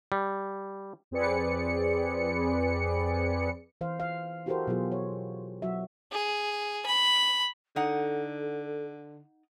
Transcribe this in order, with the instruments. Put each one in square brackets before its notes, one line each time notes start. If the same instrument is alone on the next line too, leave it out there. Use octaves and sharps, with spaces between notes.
[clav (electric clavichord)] G3
[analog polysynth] F2 C4 G#4 B4 D5 C#7
[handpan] E3 C5 F5
F5
E4 F#4 G4 A4 A#4 C5
B2 F#3 F4 G#4
C#5
F#3 F#4 E5
[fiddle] G#4
B5
[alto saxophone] D3 [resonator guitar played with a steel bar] D#4 F#5 [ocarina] A4